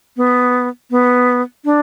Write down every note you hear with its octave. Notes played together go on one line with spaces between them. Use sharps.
B3
B3
D4